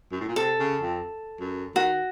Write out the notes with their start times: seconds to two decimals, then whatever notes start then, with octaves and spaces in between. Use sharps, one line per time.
0.12 F#2
0.20 A2
0.28 A#2
0.36 C3 A4
0.60 C#3
0.82 F2
1.40 F#2
1.75 D#3 F#4